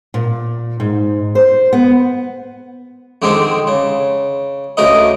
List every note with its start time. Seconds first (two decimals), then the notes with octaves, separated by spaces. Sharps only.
0.14 A#2
0.80 G#2
1.35 C5
1.73 B3
3.22 F2 D3 D#3 G#3 C4 D4
3.67 C#3
4.77 D2 C#3 A3 A#4 D#5